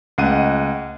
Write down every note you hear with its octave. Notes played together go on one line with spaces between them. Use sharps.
C#2 A3 D#5 F#5 D#7